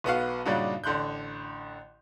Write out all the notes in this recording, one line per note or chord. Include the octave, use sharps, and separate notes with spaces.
B1 B3 F#4 F5
G2 A#2 C#3 D4 D#4 F#4
A1 D3 C6 F#6 G6